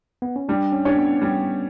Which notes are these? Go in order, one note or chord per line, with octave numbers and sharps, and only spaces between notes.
B3
C#4
G3 D4
C#4
C#4 D4 G4 C#5
B3
G3